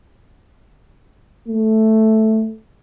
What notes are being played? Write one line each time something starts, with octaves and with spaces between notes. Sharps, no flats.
A3